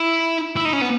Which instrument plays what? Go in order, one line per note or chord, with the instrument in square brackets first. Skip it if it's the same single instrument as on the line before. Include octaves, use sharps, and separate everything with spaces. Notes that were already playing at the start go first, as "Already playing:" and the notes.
Already playing: [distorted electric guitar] E4
E4
D#4
C#4
B3